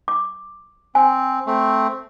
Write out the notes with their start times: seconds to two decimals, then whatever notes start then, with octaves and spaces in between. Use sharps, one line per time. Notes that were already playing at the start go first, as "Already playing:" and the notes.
0.08 D6
0.95 C4 G#5
1.46 A3 C4